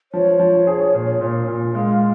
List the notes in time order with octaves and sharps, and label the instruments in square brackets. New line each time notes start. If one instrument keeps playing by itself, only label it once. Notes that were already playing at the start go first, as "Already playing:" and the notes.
[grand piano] F3 [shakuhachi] C#5
[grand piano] F3
G#4
A#2
A#2
A#2
[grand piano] G#3 [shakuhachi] F5